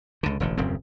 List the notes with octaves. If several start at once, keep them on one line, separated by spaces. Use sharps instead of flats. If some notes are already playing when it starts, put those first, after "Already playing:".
C#2 D3
E1 A1 D3
D#1 F#2 C#3 C4